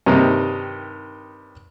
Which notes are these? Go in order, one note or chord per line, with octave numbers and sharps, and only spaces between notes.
G2 C3 D#3 C4 D#4